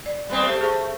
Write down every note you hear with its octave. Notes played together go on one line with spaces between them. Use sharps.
D5
G3 B3 C4
A3 G4 C5
G#4 C5 C#6